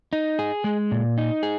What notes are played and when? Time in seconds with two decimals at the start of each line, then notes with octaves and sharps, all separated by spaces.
0.13 D#4
0.39 G#4
0.64 G#3
0.91 A#2
1.18 D#4
1.43 G#4